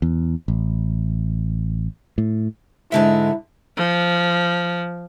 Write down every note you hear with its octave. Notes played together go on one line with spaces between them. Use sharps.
E2
A1
A2
G#2 D3 G#3 E4 E5
F3